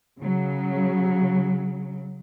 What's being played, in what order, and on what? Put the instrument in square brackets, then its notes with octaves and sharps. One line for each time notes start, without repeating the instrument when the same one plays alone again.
[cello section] C#3 F#3